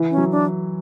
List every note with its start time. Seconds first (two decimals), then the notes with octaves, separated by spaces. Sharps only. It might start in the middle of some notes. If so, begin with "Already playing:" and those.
Already playing: E3
0.11 C#4
0.17 F#3
0.31 D4